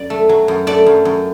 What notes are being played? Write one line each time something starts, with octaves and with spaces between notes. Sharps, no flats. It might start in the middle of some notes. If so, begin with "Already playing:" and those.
Already playing: F#2 D5
A3
F#3
F#2
A3 D5
F#2
F#2